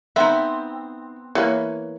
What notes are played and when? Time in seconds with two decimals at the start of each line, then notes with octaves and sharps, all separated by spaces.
0.16 B3 C4 D#4 E5
1.35 E3 A#3 B4 C#5